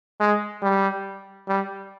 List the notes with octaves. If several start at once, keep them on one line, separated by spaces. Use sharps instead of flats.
G#3
G3
G3